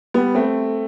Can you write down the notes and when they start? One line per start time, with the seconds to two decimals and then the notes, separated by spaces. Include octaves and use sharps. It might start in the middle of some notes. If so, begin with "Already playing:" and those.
0.14 G3 B3
0.35 A3 C4